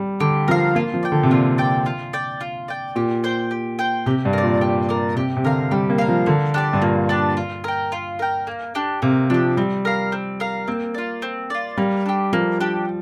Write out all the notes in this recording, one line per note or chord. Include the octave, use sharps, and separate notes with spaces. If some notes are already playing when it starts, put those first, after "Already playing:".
Already playing: G3
D3 G4
F3 A#4 F5
A#3 F4
F3
D5 G5
D3
C3
A#2 F4
D5 G5
F4
D5 G5
F4
D5 G5
A#2 G4
C5 G5
G4
C5 G5
C3 G4
G2
A#4 D5
A#2
G4
A#4 D5
C3 G4
C3
D3 A#4 F5
G3 G4
A#3
A#4 F5
F3
D3 A#3
D4 G4 D5
G2
A#2 A#3
D4 G4 D5
F4
A#4 G5
F4
A#4 G5
A#3
D4 G4
C3 A#3
F3 D4 G4
G3 C4
A#4 F5
C4
A#4 F5
A#3 C4
F4 D5
C4
F4 D5
G3 A#3
D4 G4
F3 A#3
D4 G4